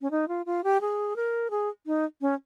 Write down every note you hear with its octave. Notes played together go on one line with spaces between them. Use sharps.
C#4
D#4
F4
F4
G4
G#4
A#4
G#4
D#4
C#4